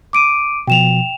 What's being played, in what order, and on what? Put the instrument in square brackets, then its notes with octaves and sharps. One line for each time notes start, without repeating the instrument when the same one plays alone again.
[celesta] D6 D7 D#7
[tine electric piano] B2 F3 [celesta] G5 E7 F7